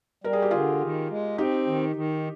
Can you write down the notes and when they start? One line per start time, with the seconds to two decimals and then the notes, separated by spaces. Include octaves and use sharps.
0.24 G3 A#4
0.33 G#4
0.42 G4
0.51 D3 F4 G#4
0.81 D#3
1.10 G#3
1.38 C4 D#4 G4
1.67 D#3
1.96 D#3